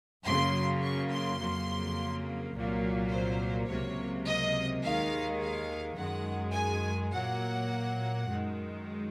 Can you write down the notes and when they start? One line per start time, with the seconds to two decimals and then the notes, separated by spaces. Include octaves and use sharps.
0.25 F#2 C#3 F#3 A#3 C6
0.82 C#6
1.10 C6
1.39 F2 C#3 F#3 A#3
2.53 C2 A#2 F#3 A#3
3.11 C5
3.67 C#2 C3 F#3 A#3 C#5
4.26 D#5
4.82 D#2 D#3 G#3 F5
5.39 F5
5.96 F#2 D#3 G#3 F#5
6.54 G#5
7.11 A#2 F#3 A#3 F#5
8.25 F#2 D#3 G#3